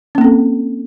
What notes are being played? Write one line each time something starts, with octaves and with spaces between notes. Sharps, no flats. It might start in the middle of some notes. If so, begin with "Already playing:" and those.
A#3 C4 C#4 A4